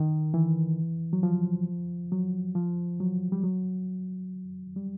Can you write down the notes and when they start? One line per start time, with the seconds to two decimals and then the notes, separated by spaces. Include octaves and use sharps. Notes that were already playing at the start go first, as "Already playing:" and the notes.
Already playing: D#3
0.34 E3
1.13 F#3
1.23 F3
2.12 F#3
2.55 F3
3.00 F#3
3.32 G3
3.44 F#3
4.76 G3